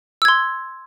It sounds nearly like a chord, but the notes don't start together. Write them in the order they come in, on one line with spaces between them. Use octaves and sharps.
E6 G#6 C6